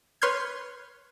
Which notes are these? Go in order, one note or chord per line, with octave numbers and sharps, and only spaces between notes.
B4 C#5 C6 F6 G6 G#6